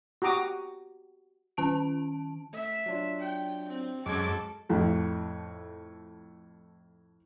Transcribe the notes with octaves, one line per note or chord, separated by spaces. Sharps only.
F#4 G4 A#5 D6 D#6
D#3 C#4 A5 D7
A3 E5
F#3 D4 F4
G5
C4
F#2 G#3 A4 D6 G#6
F2 A2 A3